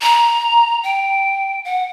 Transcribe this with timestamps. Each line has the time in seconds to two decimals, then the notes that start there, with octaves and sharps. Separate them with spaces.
0.02 A#5
0.83 G5
1.65 F#5